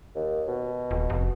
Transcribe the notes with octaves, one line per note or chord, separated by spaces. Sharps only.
D#2
B2
D#1
F1